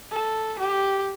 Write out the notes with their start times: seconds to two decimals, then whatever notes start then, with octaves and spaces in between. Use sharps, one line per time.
0.12 A4
0.59 G4